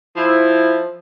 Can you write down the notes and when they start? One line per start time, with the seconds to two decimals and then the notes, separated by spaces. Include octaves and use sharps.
0.16 F3 E4